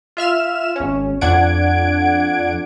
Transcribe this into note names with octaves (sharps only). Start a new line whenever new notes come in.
F4 E5 F6 E7
G#1 C#4
F2 D4 F#5 G#6 D7